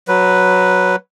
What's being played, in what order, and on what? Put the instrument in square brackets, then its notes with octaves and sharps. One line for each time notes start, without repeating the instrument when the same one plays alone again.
[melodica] F#3 B4